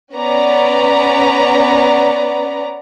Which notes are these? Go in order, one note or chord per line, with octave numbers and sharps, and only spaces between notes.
B3 C#4 D5 A#5